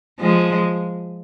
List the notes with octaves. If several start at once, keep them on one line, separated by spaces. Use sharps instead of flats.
F3 G#3